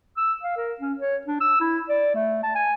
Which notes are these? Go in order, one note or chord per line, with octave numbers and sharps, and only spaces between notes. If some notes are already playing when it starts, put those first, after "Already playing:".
E6
F5
A#4
C#4
C#5
D4
E6
E4
D5
A3
A5
G#5